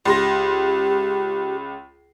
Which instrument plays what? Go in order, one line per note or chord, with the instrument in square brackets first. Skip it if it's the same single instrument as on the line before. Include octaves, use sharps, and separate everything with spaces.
[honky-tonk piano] C#2 C6 A#6 [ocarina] G4